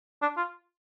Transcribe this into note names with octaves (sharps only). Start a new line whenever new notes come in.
D4
F4